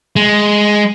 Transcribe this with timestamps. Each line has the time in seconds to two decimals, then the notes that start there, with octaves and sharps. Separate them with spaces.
0.16 G#3